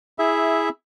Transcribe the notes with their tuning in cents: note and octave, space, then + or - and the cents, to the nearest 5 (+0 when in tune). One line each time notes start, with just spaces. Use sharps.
E4 -10 G#4 +0 E5 +0